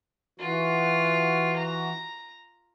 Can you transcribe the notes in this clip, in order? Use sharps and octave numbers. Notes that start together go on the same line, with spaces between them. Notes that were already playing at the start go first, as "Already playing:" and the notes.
E3 F4 F#4
A#5